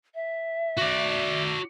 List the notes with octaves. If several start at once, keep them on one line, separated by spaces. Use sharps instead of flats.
E5
F#4 D5